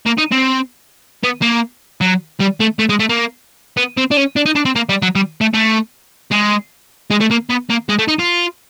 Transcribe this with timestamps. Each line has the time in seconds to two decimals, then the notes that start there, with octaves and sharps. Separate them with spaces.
0.06 A#3
0.18 D#4
0.31 C4
1.23 B3
1.42 A#3
2.01 F#3
2.40 G3
2.60 A3
2.79 A3
2.89 G#3
3.00 A3
3.10 A#3
3.77 B3
3.97 C4
4.11 D4
4.17 C#4
4.36 D4
4.46 D#4
4.55 D4
4.65 C4
4.76 A#3
4.89 G3
5.02 F#3
5.15 G3
5.41 A3
5.54 A3
6.32 G#3
7.11 G#3
7.20 A3
7.31 A#3
7.50 B3
7.70 A#3
7.89 G#3
7.99 A3
8.08 D#4
8.19 F4